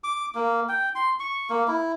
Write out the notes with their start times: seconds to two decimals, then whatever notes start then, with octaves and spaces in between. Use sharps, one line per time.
0.04 D6
0.35 A#3
0.69 G5
0.95 C6
1.20 C#6
1.50 A#3
1.68 E4